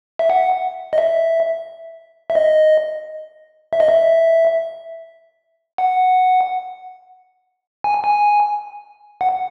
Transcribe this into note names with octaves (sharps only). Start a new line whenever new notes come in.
E5
F#5
D#5
E5
E5
D#5
E5
D#5
E5
F#5
G#5
G#5
F#5